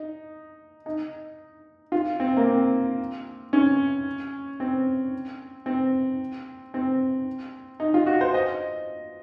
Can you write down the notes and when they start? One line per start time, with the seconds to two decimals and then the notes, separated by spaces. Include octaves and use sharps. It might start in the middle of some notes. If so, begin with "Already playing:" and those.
Already playing: D#4
0.86 D#4
1.92 F4
2.20 C4
2.37 A#3
2.47 C4
3.53 C#4
4.60 C4
5.66 C4
6.74 C4
7.80 D#4
7.94 F4
8.06 F#4
8.21 C5
8.34 D#5